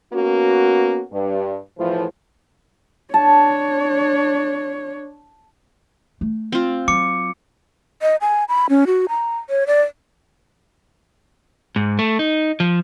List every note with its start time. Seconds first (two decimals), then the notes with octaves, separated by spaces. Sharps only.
0.12 A#3 B3 C#4 F#4
1.11 G2
1.78 E2 A2 F3
3.14 D4 C#5 A5
6.21 A3
6.52 C4 F4
6.88 F#3 D6 C#7
8.02 D#5
8.21 G#5
8.49 B5
8.69 C#4
8.87 F#4
9.09 A#5
9.50 C#5
9.67 D5
11.76 G#2
11.99 A3
12.19 D#4
12.60 F3